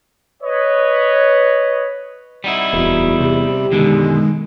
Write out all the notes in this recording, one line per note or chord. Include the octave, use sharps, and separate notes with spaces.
B4 C#5 D#5
G3 D#4 E4 F#5
D1 E2 F#4
C3 G4
F#2 B2 D3 D#3 G#3